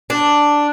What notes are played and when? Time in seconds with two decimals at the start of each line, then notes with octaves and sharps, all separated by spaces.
0.10 D4